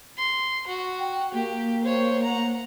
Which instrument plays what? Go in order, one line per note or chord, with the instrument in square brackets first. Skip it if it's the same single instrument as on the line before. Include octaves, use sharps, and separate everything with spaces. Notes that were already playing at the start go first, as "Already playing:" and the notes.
[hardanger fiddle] C6
F#4
[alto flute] G5
[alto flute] A#3 [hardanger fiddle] G4
[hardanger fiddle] C5 C#5
F#5 A#5